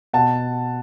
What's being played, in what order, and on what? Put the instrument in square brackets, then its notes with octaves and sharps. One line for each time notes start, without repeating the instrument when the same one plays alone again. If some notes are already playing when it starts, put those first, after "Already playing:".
[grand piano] B2 F#5 A5